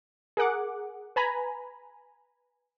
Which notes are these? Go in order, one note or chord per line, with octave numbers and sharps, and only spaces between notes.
G#4 A#4 F#5 D6
B4 G#5 A#5 B5